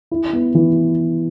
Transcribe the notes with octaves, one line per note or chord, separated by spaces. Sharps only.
E4
B3
E3